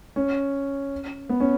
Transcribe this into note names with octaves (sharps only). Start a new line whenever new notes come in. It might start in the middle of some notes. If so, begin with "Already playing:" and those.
C#4
B3
C#4